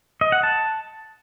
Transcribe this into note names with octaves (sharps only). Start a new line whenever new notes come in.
D#5
F#5
A5